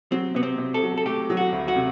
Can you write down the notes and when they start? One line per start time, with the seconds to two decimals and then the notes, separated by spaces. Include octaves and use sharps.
0.12 F#3 C4
0.35 C3 B3
0.43 C4
0.58 C3
0.74 A4
0.83 F#3
0.98 A4
1.06 A3 G4
1.30 F#3
1.37 F#4
1.52 D2
1.68 F#4
1.76 C3